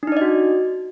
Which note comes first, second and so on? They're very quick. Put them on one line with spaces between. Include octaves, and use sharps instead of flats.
D4 D#4 D5 D#5 F#4